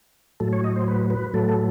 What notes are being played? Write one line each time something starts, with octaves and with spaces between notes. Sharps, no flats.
A2 F#3 A4
C#5
D#5
C5
B4
B4
A2 F#3 A4
A4